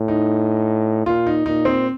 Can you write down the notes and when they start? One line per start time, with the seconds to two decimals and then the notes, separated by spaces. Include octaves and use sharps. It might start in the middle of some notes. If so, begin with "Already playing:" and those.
Already playing: A2
0.08 D#4
1.06 A#2 F4
1.27 D#4
1.46 A#2 D#4
1.65 C4